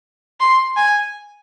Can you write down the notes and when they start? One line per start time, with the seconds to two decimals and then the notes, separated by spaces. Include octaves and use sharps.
0.40 C6
0.77 G#5